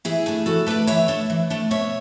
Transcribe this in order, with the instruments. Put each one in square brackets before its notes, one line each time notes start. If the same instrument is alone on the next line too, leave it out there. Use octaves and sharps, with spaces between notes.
[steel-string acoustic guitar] E3 E4 G#4
A3 D4
E3 F#4 A4
A3 D4 B4 D5
E3 C#5 E5
A3 D4
E3
A3 D4
B2 C#5 E5